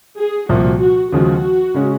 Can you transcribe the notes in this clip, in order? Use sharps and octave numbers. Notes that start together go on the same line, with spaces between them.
G#4
C2 A#2 F3 F#4
F#4
D#2 C#3 F3 G#3 F#4
C#3 G#3 C#4